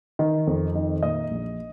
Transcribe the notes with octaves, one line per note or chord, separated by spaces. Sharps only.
D#3
F2
D#3
A#2 D#5
A#1